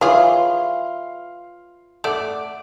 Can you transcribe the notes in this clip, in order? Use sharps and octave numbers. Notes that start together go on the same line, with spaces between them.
E3 F4 G#4 B4 C#5 E5 F5
A3 D5 F#5 D6